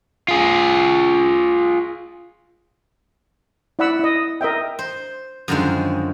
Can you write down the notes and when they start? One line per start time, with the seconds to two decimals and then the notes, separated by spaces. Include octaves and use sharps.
0.28 F4 G#4
3.79 E4 D5 F#5 B5 E6
3.99 E4 D#5
4.41 A#4 D#5 E5 G5
4.79 C5
5.48 F#2 D3 D#3 F3 G#3